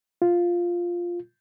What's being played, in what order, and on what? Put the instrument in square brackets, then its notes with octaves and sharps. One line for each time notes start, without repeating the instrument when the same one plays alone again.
[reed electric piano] F4